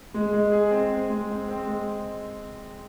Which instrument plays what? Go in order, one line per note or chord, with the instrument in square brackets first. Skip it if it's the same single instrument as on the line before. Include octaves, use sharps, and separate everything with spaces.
[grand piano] G#3
G#3
G#4
C4
C4
G#3
C4
C4
G#3